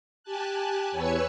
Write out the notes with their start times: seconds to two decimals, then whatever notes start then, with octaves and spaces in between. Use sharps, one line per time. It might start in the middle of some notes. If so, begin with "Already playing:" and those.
0.23 G4 G#5 A5 F#6
0.91 E2 B4 C#5 G#5 E6 C#7